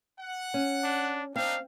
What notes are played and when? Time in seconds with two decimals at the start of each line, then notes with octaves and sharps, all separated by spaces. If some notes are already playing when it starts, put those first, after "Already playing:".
0.20 F#5
0.54 C#4
0.84 D4
1.36 A#3 C4 D4 D#4 F5